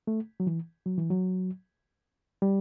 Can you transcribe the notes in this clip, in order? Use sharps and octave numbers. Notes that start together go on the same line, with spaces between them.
A3
F#3
E3
F#3
E3
F#3
G3